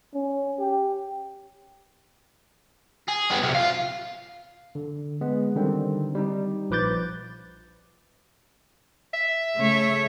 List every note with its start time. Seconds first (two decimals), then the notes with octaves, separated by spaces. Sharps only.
0.14 C#4
0.59 G4
3.09 G#4
3.30 G3 B3
3.42 B1 C3
3.55 F4 F5
4.75 D3
5.21 G#3 B3
5.56 D3 D#3 G3 C4
6.15 G3 D#4
6.70 A#1 F3 B4 D6 G6 A6
9.14 E5
9.58 C#3 A3 C#5